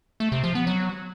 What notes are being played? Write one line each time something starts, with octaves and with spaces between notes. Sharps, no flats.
A3
C3
F3
B3
F#3